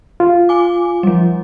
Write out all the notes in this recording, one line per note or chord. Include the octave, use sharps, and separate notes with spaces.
F4
G#5 D6
F3 G3